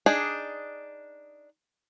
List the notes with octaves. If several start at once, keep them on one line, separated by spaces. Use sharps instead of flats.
D4 D#4 G#4